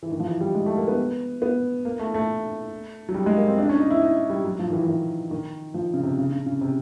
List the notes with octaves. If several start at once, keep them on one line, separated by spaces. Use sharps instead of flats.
E3
D#3
F3
E3
G3
G#3
A3
A#3
B3
B3
A#3
A3
A3
F#3
G3
G#3
A#3
C4
D4
C#4
D#4
E4
D#4
G3
F#3
F3
D#3
E3
E3
D#3
D#3
F3
C#3
C3
C#3
C#3
C#3
C3